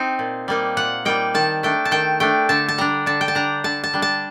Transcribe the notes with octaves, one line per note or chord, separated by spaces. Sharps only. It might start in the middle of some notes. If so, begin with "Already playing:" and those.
Already playing: C4 D#4
A#2
G3 A#3 D#4
A#2 F#5
G3 A#3 D#4 G5
D#3 A5
A3 D4 G5
A5
D#3 G5
A3 D4 G5
D3 A5
A5
G3 D4 A#5
D3 A5
G5
A5
G3 D4 A#5
D3 A5
A5
G3 D4
A5